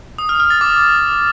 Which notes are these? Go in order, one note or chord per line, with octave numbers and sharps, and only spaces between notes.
D#6
F6
F6
A6
D6